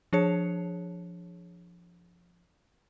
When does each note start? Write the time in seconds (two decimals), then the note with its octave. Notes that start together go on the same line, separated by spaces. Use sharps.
0.13 F3 D4 G#4 C#5 C#7